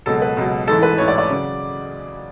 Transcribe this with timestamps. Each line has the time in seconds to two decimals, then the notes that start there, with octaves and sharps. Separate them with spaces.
0.06 C#2 B2 F#3 A4
0.22 B4
0.37 C#2 B2 F#3
0.67 A1 G#2 E3 A4
0.83 B4
0.98 A1 G#2 E3 C#5
1.08 D5
1.18 D5
1.29 C#3 F#3